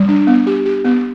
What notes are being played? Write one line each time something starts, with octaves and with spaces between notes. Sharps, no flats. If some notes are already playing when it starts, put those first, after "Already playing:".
Already playing: G3
D4
B3
G4
G4
B3